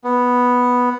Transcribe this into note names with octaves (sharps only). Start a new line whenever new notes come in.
B3